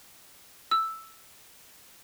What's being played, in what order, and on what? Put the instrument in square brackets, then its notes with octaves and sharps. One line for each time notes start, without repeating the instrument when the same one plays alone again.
[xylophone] E6